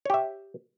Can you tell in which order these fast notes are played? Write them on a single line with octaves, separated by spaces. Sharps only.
C#5 G4 E5